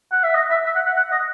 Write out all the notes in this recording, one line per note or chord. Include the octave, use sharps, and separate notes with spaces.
F#5
E5
D#5
E5
E5
F#5
F#5
F#5
D#5